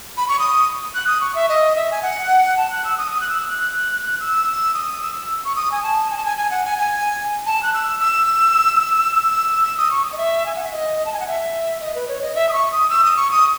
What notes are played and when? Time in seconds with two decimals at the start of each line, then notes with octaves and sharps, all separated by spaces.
0.17 B5
0.28 C#6
0.39 D#6
0.95 F#6
1.07 D#6
1.21 C#6
1.35 E5
1.49 D#5
1.76 E5
1.91 G#5
2.02 F#5
2.57 A5
2.70 F#6
2.85 E6
2.98 D#6
3.12 D#6
3.21 F#6
3.29 E6
3.48 F#6
4.20 E6
4.74 D#6
5.02 E6
5.45 C#6
5.56 D#6
5.72 G#5
5.83 A5
6.10 G#5
6.17 A5
6.25 G#5
6.38 G#5
6.51 F#5
6.65 G#5
6.78 G#5
7.46 A5
7.63 F#6
7.74 E6
8.00 E6
9.64 E6
9.77 D#6
9.91 C#6
10.05 D#6
10.12 D#5
10.18 E5
10.46 G#5
10.55 F#5
10.64 E5
10.72 D#5
11.05 A5
11.13 G#5
11.20 F#5
11.27 E5
11.81 D#5
11.95 B4
12.08 C#5
12.22 D#5
12.35 E5
12.49 D#6
12.53 C#6
12.72 D#6
12.90 E6
13.04 D#6
13.17 C#6
13.31 D#6